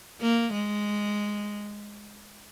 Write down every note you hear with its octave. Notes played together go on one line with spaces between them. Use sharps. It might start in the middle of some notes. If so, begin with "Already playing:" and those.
A#3
G#3